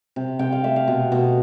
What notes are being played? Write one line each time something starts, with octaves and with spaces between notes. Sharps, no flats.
C3
C3 G5
F5
A3 E5
F5
B2
B2